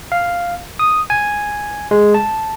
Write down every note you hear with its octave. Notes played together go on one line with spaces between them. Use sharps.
F5
D#6
G#5
G#3
A5